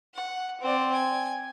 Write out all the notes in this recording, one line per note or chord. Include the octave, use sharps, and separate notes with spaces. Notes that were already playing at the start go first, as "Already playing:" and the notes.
F#5
C4 D5
G#5